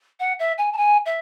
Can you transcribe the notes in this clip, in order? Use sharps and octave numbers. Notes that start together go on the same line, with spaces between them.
F#5
E5
G#5
A5
G#5
E5